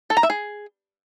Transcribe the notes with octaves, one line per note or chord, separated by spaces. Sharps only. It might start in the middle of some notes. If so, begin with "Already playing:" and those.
A4
A#5
E5
G#4